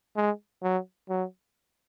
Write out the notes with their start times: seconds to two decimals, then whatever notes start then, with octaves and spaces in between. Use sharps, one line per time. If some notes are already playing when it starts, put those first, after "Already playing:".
0.16 G#3
0.63 F#3
1.09 F#3